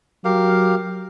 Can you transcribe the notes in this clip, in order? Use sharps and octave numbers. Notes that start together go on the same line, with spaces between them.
F#3 G4 A#4 F5